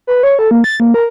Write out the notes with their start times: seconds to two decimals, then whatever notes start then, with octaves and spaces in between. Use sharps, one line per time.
0.07 B4
0.23 C#5
0.39 A4
0.51 A#3
0.64 A6
0.80 A#3
0.94 A#4